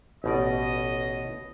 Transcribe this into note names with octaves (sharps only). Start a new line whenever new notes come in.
A1 B2 D5 D#5